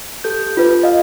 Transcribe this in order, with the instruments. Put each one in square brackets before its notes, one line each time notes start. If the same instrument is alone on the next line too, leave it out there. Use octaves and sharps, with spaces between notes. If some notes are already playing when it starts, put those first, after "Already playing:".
[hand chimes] G4 A4 G6
[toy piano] F4 B4
[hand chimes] D#5 F5